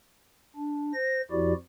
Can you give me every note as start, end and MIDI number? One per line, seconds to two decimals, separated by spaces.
0.56 0.93 62
0.94 1.21 72
0.94 1.21 94
1.31 1.53 41
1.31 1.53 53
1.31 1.53 64
1.31 1.53 66
1.31 1.53 67
1.31 1.53 74